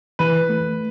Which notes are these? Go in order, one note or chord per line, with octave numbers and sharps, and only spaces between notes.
E3 B4
A3